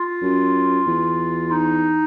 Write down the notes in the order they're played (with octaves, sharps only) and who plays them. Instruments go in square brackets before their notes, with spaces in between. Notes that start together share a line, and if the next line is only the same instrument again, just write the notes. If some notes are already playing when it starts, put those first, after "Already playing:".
Already playing: [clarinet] F4
[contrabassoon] F#2
E2
[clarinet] D#4